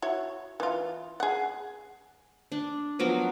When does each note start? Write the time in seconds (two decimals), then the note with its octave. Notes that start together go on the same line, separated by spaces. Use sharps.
0.02 E4 F#4 C#5
0.60 E3 F4
1.20 G#4 F#5
2.52 D4
2.99 F3 F#3 B3 A#4